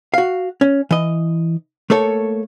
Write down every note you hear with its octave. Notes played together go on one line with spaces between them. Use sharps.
F#4 F5
C#4
E3 D#5
A3 A#3 A4 C#5